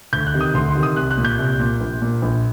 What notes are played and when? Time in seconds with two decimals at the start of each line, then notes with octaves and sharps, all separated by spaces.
0.13 D2 G6
0.27 F#6
0.34 C3 D#3
0.41 D#6
0.54 D2 C6
0.69 C6
0.75 C3 D#3
0.83 D#6
0.96 C2 F#6
1.11 F#6
1.18 A#2
1.25 G6
1.39 C2
1.60 A#2
1.81 A#1
2.02 A#2
2.22 A#1